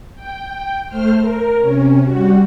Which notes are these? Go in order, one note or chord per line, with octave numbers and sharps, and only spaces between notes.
G5
A3 C5 F6
A#4
C3 C#4
G3 F#4